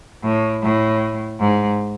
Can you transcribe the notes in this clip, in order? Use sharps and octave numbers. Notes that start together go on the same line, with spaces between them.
A2
A2
G#2